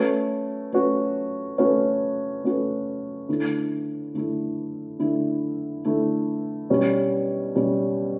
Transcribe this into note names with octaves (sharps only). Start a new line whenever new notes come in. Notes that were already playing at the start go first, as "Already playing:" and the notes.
Already playing: A3 C#4 F#4 B4
A3 C#4 F#4 B4
A3 C#4 F#4 B4
A3 C#4 F#4 B4
D3 A3 E4
D3 A3 E4
D3 A3 E4
D3 A3 E4
B2 G3 C#4
B2 G3 C#4